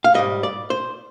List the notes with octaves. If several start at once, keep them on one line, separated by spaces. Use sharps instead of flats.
F5
G#2 G3 D#5
D5
C5